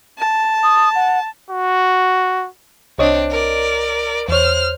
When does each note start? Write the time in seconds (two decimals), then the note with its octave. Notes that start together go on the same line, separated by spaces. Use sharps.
0.18 A5
0.63 D#6
0.95 F#5
1.50 F#4
2.98 C2 C4 D4 C#5 D#5
3.30 A#4 D5
4.29 E2 C5 C#5 F6